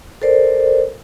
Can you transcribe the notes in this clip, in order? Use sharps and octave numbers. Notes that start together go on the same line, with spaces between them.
A4 A#4 C5 D5